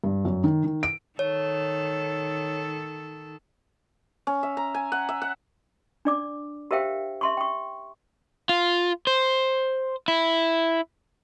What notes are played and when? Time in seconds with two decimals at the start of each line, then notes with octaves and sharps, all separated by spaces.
0.04 G2
0.25 F#2
0.44 D#3
0.64 D#3
0.83 D7
1.19 D#3 A4 C#5
4.27 C#4
4.43 E5
4.57 A#5
4.74 G#5
4.92 F#5
5.09 E5
5.22 F#5
6.05 D4 D5 D6
6.71 G4 A#4 C5 E5 F5 G5
7.21 E5 C6 C#6
7.37 G5 C#6
8.49 F4
9.07 C5
10.08 E4